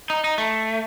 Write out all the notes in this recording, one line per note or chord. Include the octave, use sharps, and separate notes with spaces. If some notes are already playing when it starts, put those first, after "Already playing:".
D#4
D#4
A3